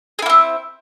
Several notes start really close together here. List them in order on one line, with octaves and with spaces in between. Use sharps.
G#4 E4 A#3 C4